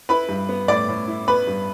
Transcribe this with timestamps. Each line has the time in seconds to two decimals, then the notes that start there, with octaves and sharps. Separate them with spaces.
0.09 E4 B4 B5
0.29 G2
0.49 B3
0.68 A2 D5 D6
0.88 A2
1.08 E4
1.28 B3 B4 B5
1.47 G2